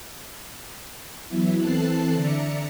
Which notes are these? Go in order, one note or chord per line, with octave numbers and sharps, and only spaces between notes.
E3 F#3 B3 E4
E3 C4 A4 A5 F#6 C7
D3 D5 E5 A#5 C#7